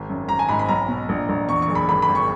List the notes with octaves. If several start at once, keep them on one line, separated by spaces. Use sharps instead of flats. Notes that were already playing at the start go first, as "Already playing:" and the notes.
Already playing: G#1
F#2
G#1 A#5
G#5
G#2 B5
B5
B1 A#5
B2
A#1
A#1
E2 C#6
C#6
F#1
B5
G#1 B5
B5
G#1
C#6